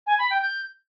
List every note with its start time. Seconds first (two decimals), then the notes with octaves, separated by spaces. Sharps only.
0.07 G#5
0.18 B5
0.30 G5
0.42 G6